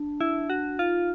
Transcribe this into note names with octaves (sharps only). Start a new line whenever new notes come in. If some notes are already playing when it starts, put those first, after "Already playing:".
Already playing: D4
E4
F#4
D#4 F4